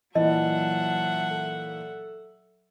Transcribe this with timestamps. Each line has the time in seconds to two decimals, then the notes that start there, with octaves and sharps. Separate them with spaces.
0.15 A#2 E3 F#3 D#5 E5 F#5 A5
1.30 A4